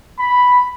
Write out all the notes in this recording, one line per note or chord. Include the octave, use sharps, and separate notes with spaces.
B5